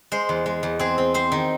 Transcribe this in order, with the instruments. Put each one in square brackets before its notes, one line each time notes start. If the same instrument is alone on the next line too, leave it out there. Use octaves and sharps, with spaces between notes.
[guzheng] G#3 C5
E2
G#3
E2
C4 G#4
C4
C4 C5
D#3